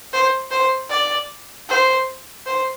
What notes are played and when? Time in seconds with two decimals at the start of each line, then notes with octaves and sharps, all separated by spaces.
0.13 C5
0.51 C5
0.90 D5
1.69 C5
2.46 C5